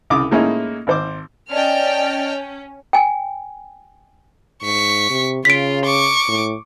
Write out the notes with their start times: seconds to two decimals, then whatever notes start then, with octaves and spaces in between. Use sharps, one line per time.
0.10 C2 C#3 D6 D#6
0.31 A2 G#3 A#3 C#4 D#4 E4
0.87 G#1 C5 D6
1.50 C#4 D5 D#5 G5 A5 F6
2.93 G5 G#5
4.62 G#2 C#6 B6
5.10 C3
5.45 C#3 F4 B6 D7
5.85 C#6 D6
6.28 A2